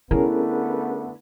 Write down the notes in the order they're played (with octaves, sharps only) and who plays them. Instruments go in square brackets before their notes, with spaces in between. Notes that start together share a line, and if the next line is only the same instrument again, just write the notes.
[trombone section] D3 A3 B3 [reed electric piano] C#4 G#4 A#4 [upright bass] E4